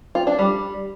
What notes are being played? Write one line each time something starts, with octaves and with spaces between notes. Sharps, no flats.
F4
D4
G3